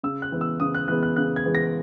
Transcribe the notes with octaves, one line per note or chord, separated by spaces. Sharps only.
C#3 E6
F#6
E3 G#3 B3
E6
C#3 D#6
F#6
E3 G#3 B3 F#6
F#6
C#3 F#6
G#6
E3 G#3 B3
A#6